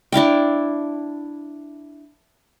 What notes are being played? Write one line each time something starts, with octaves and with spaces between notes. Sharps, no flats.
D4 E4 F5 G5